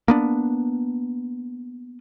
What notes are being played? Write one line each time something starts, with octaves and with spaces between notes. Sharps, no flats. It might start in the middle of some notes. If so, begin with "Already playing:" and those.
A#3 B3 D4